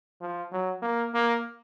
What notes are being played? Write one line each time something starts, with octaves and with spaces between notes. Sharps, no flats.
F3
F#3
A#3
A#3